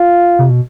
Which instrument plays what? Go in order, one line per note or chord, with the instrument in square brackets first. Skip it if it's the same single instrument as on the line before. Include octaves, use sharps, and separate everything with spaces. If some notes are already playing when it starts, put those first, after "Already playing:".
Already playing: [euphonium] F4
[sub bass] C3
B2